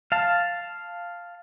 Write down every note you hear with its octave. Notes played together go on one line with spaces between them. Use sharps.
F5 A5